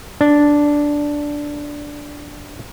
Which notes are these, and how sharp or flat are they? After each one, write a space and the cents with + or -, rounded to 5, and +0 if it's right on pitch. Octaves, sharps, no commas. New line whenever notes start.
D4 -5